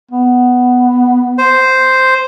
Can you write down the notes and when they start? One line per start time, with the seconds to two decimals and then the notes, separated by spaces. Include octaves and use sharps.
0.11 B3
1.38 C5